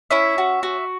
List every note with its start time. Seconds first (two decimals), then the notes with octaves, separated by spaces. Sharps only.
0.11 C#4 E4 E5
0.38 F#4
0.63 F#4